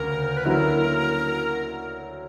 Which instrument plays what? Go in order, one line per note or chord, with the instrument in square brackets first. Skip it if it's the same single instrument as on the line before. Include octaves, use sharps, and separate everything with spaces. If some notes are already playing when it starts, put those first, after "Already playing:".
Already playing: [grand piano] D2 C#3 [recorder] A#4
[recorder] B4
[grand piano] D3 F#3 A#3 C#4 E4 [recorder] A#4